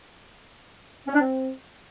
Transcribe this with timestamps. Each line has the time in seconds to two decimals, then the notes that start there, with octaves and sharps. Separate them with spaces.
1.07 C#4
1.14 D4
1.21 C4